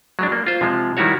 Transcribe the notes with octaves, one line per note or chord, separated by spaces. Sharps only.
F#3 G#3 D4
A#3
F4 C5
C3 F3 G#3
D#3 G3 E4 F#4 C#5